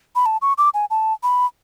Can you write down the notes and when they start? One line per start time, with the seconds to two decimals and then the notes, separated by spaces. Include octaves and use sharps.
0.15 B5
0.26 A5
0.42 C#6
0.58 D6
0.74 G#5
0.90 A5
1.23 B5